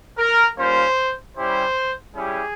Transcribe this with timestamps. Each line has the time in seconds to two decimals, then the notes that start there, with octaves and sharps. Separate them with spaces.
0.18 A#4
0.56 G3 A#3 C#4 F4 C5
1.35 G3 C#4 E4 G4 C5
2.14 G3 C#4 E4 G4 G#4